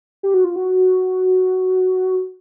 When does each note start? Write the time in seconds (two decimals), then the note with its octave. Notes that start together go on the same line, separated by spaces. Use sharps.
0.23 G4
0.34 F#4
0.44 F4
0.56 F#4